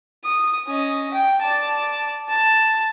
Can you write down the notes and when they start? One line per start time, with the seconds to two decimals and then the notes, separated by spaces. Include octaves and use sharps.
0.25 D#6
0.68 C#4 D#5
1.14 G5
1.42 D5 A5
2.29 A5